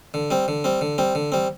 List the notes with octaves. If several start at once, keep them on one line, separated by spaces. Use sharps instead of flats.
D3
G3 C4
D3
G3 C4
D3
G3 C4
D3
G3 C4